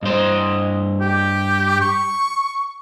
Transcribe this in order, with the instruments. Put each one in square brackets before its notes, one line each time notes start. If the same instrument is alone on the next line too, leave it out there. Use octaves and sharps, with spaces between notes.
[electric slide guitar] G2 C5 [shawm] D#5
[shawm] G4
C#6